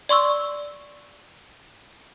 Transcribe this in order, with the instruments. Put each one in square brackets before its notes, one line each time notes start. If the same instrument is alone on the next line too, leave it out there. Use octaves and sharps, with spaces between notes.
[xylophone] D5 C6 C#6 E6